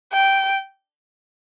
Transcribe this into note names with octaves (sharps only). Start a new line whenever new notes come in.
G5